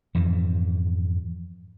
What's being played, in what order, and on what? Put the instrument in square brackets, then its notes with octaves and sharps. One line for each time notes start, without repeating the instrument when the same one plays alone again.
[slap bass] F2 G#2 E3